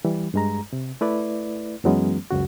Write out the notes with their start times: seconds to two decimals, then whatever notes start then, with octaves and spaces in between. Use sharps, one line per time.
0.05 E3 G3
0.34 G2 G#3 A#5
0.73 C3
1.01 A3 E4 B4 D5
1.84 F#2 E3 F#3 G#3 B3 C#4
2.31 C#2 F#2 C#3 F#4